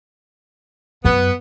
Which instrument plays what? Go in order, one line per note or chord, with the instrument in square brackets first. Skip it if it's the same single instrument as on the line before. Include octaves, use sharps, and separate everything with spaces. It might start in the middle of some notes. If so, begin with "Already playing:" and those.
[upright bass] F#2 [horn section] B3